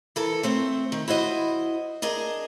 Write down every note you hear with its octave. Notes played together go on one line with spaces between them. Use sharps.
E3 A4 A#4
A3 C4 C5
D#3
E4 F#4 C5 D#5
D4 G#4 A#4 D#5